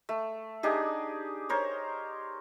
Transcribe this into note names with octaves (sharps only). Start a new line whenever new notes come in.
A3
D4 D#4 G4 G#4
A#4 C5 C#5